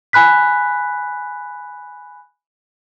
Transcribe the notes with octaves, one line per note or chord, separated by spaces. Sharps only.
G#5 B5 F#6 B6